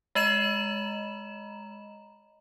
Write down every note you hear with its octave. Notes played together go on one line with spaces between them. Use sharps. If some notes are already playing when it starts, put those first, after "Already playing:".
G#3 D#5 A#5 E7